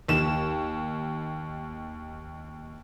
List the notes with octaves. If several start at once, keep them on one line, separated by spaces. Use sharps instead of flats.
D#2 E7